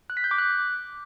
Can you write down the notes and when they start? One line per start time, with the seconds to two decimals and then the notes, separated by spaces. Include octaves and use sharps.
0.10 F#6
0.17 B6
0.24 G6
0.31 D6
0.38 F#6